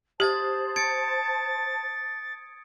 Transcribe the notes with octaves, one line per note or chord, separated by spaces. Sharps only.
G4 C5 A5 D#6 G#6 A6
G#6 A6 C#7 D7